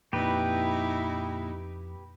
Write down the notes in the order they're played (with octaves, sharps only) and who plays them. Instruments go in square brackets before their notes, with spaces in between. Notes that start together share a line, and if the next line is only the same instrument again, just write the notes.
[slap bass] F2 [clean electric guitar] A#2 [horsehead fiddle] D#4 E4 [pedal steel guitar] G4 B4